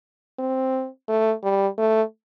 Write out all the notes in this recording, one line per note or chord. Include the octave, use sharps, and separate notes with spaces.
C4
A3
G3
A3